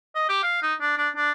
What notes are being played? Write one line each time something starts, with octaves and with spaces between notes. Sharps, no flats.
D#5
G4
F5
D#4
D4
D4
D4